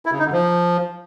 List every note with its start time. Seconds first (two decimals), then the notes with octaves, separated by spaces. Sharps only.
0.06 E4
0.12 C#3
0.19 D#4
0.26 D3
0.32 F3